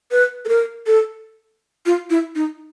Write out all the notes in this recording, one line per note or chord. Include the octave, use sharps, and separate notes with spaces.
B4
A4
A#4
A4
F4
E4
D#4